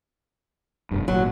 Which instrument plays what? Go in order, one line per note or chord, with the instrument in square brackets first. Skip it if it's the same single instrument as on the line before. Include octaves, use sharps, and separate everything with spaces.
[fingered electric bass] F1 G2
[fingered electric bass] G#1 A#2 [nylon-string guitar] F#3 [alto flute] F#4